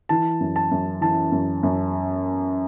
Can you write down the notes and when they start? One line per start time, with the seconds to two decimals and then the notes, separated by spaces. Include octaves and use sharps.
0.09 E3 A5
0.41 F#2
0.56 A5
0.71 F#2
1.01 E3 A5
1.32 F#2
1.63 F#2